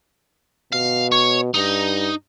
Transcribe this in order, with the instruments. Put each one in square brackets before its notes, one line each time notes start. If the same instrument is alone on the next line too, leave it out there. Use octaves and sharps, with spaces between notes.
[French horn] B2 [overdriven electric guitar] F5
[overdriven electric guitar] C#5
[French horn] G2 [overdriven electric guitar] D#4